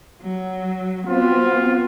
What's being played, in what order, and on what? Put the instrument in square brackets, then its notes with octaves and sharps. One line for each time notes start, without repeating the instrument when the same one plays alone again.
[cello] F#3
[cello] B3 F#4 [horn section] C4 F4